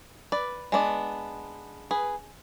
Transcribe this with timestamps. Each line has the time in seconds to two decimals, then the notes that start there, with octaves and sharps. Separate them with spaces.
0.32 B4 D5
0.72 G#3 B3 D4
1.91 G#4 B4